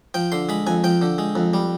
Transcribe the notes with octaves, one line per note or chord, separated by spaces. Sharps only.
F3 G5
D3 C6
G#3 B5
F2 G#5
F3 G5
D3
G#3
F2
G3